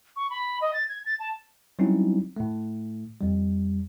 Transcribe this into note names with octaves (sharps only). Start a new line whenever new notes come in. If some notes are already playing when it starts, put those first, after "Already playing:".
C#6
B5
D#5
A6
G#6
A6
A5
F#3 G3 C4 C#4 D#4 E4
A2 A3
F2 G3